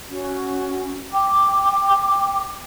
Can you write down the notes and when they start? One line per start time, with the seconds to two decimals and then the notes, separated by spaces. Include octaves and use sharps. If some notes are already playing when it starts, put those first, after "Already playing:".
0.11 C#4 F#4
1.12 G5 D6